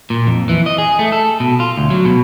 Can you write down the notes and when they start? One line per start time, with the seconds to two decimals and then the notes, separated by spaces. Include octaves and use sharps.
0.10 A#2
0.27 F2
0.49 E3
0.66 D#5
0.78 G#4
0.99 A3
1.12 A4
1.40 B2
1.60 F4
1.78 D2
1.90 F#3
2.05 B2